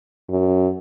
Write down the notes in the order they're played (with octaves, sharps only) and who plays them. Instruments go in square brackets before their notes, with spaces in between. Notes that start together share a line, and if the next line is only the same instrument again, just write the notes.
[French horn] F#2